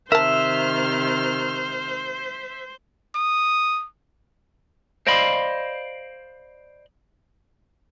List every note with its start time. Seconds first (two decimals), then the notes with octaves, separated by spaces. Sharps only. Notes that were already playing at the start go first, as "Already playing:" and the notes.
0.12 C3 D#3 A#4 C5 E5 A5 F6
3.15 D#6
5.07 C5 D5 D#5 F5 B5 C6